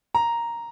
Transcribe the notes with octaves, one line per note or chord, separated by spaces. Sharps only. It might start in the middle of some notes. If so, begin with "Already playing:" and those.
A#5